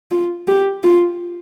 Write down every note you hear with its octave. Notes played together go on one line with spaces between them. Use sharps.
F4
G4
F4